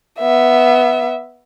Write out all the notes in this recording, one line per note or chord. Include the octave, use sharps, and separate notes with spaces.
B3 E5